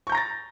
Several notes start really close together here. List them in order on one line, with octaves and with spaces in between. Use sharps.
C#6 G6 A#5 A#6 A6